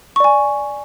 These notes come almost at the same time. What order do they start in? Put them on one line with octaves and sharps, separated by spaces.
C#6 D5 G#5